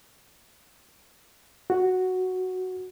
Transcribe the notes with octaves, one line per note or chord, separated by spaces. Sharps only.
F#4